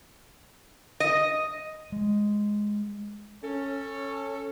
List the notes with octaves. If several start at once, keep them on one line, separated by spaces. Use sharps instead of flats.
D#5
G#3
C#4 A4 C#5